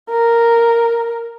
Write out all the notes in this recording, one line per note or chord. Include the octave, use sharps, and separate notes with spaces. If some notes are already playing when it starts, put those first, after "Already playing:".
A#4